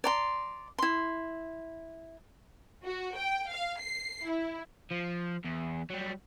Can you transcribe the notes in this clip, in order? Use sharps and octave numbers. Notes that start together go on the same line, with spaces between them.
D5 A#5 C6
E4 C6
F#4
G5
F5
C7
E4
F3
E2
F#3 G3